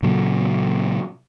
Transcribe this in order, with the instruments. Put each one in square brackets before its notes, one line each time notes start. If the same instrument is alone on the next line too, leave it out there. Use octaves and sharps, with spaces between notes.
[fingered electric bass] A#2 C#3 F#3